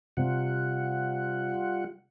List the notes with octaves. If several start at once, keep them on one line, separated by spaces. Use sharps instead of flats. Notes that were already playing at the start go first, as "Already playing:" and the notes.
C3 G3 F4 F#5